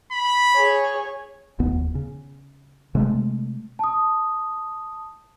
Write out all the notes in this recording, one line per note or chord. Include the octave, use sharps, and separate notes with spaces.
B5
G#4 C#5
F1 D#2 B3
C#3
C3 G#3 A3
A5 D#6